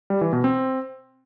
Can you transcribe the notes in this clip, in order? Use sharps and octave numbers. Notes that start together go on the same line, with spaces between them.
G3
E3
B2
C4